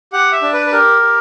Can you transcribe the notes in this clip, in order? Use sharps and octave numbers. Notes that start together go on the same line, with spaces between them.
G4 F#5
E5
D4
B4
B4
G4 A#4
G4